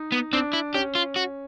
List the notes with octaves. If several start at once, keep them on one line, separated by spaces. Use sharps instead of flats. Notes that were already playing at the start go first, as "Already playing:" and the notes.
Already playing: D#4
B3
C4 D4
E4
C#4 G4
F4
F#4